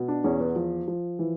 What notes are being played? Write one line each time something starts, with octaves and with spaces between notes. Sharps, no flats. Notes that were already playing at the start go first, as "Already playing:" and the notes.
Already playing: B2
D4
E2 C#4
B3
F3
F3
E3